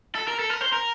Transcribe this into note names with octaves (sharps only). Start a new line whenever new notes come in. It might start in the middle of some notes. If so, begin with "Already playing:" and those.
A4
A#4
A4
A#4
C5
A#4